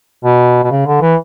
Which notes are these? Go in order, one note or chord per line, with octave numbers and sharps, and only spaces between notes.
B2
B2
C#3
D3
E3